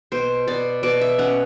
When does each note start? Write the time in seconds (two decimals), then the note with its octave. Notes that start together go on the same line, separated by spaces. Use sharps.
0.12 B2 C5
0.47 B2 D5
0.83 B2 D5
1.01 E5
1.18 C#4 F#5